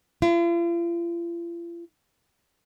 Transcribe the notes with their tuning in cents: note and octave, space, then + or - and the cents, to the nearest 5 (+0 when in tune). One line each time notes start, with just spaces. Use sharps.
F4 -45